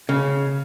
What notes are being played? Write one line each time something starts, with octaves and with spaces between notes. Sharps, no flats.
C#3